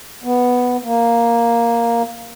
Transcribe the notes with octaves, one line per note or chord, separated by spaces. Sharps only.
B3
A#3